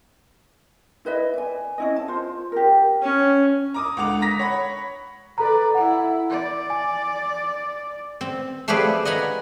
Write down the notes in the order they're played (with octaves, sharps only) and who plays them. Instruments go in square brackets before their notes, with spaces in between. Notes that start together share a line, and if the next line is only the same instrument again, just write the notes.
[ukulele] E4 B4 D#5 E5
D5 G#5
C#4 E4 D#5
A5
F4 C5
G4 A#4
[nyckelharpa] C#4
[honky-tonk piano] A#5 D6 D#6
C#2 D3 F#5 D6 F7
A#5 D#6 A#6 B6
C#5 F#5 B5
[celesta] A4 A#5 [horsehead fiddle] B4 D5
[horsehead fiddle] E4 [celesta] F#5
[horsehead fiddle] D5
[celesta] G#5
[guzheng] C4
F3 A3 G4 G#4 B4 D5
D#5 F#5 G#5 A#5 B5